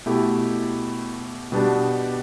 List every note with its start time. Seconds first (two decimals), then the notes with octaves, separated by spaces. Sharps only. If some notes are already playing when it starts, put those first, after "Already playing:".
0.06 B2 A3 E4 G4
1.52 B2 G3 B3 D4 G4